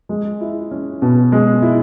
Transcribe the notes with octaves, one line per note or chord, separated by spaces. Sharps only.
G#3
E4
C#4
B2
G#3
E4